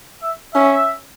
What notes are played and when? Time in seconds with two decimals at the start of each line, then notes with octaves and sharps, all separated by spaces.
0.23 E5
0.55 C#4 E5